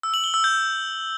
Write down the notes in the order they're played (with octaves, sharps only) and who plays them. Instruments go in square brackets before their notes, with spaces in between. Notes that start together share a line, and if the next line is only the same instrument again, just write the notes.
[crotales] E6
F#7
G7
E6
G6